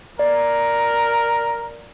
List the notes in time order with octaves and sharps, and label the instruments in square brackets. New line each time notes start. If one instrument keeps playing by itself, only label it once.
[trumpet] A#4 [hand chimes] D5